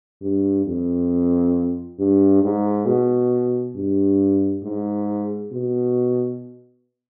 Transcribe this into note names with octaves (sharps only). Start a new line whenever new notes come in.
G2
F2
G2
G#2
B2
G2
G#2
B2